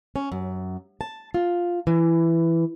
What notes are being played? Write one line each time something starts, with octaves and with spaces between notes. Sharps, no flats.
C#4
F#2
A5
F4
E3